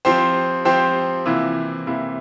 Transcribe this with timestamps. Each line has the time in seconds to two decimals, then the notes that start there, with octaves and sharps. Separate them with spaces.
0.05 F3 C4 G4 C5
0.65 F3 C4 G4 C5
1.26 C3 E3 A#3 E4
1.87 C3 E3 A#3 E4